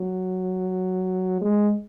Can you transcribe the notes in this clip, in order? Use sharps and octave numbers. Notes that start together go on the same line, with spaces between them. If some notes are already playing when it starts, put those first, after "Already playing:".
Already playing: F#3
G#3